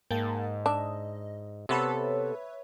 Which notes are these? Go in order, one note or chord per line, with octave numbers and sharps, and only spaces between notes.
G#2 A#3 G5 A5
D4 D#5 E5
C3 B3 A4 B4 C#5 E5 A5